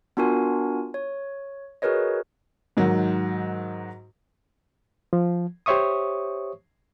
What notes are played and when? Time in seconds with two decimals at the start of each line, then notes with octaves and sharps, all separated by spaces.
0.17 B3 D4 F4 F#4 A#4 G#5
0.94 C#5
1.82 F#4 G#4 A#4 B4 C#5 D#5
2.77 G#2 D#3 F#3
5.13 F3
5.66 G4 C5 C#5 E5 C#6 D#6